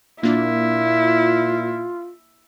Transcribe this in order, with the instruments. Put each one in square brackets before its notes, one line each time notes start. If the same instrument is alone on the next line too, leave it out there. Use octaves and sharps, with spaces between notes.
[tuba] A#2 [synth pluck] A#3 D4 [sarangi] E4 [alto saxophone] F4